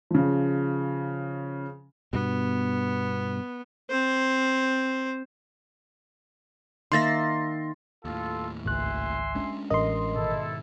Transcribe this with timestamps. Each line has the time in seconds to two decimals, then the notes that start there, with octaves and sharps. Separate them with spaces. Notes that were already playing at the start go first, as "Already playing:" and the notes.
0.11 C#3 F3
2.13 G2 B2 B3
3.90 C4 C5
6.92 D#3 A#3 E5 C6 A6 A#6
8.05 D#2 A2 F4 A4
8.65 G#1 C#2 E5 G#5 C6 F#6
9.35 G#3 C#4 D4
9.70 A1 A#4 D#5 C6
10.16 G#2 B2 D#3 E4 A4